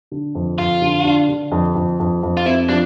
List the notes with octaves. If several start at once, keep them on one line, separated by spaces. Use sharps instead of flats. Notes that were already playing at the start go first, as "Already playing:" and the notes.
D3
F2
F2 F4
D3
D4
D3
F2
F2
F2
F2
F4
C4 E4
F3 D4